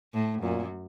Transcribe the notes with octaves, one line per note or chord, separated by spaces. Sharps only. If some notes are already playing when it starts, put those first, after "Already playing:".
A2
F#2 A#2